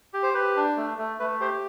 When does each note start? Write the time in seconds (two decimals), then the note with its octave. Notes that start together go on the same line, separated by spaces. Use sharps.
0.14 G4
0.23 C5
0.34 G4 B4
0.56 D4
0.77 A3
0.98 A3
1.20 A3 B4
1.40 G4 C5